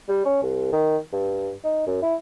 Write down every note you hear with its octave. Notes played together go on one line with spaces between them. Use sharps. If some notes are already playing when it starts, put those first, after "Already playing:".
G3
C#4
C2
D#3
G2
D#4
F#2
E4